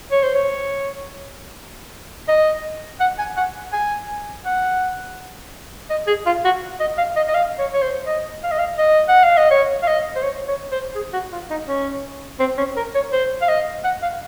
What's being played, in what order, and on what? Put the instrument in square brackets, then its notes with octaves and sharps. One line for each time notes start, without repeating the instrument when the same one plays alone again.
[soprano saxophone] C#5
C5
C#5
D#5
F#5
G#5
F#5
G#5
F#5
D#5
G#4
F4
F#4
D#5
F5
D#5
D#5
F5
C#5
C#5
C5
D#5
F5
D#5
F5
D#5
F#5
F5
D#5
C#5
F5
D#5
C5
C#5
C#5
C5
G#4
F#4
F4
D#4
C#4
C4
C#4
A#4
C#5
C5
F5
D#5
F#5
F5